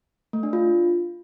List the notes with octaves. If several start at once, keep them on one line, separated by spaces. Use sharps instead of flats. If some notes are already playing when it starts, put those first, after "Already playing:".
A3
D4
F4